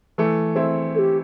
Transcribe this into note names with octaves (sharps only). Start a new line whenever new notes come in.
E3 A3
C4 E4
A4
G4